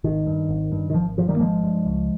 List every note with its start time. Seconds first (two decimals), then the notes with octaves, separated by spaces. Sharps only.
0.04 G#1 D#3
0.27 G2
0.49 G#1
0.72 G2
0.90 D#3
0.95 G#1 F3
1.17 G2 F3
1.29 D#3 G3
1.36 A#3
1.40 G#1 F3 G#3
1.64 G2
1.85 C#2